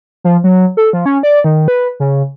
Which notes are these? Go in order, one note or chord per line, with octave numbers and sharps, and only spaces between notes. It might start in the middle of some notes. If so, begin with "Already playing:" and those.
F3
F#3
A4
F3
C#4
D5
D#3
B4
C#3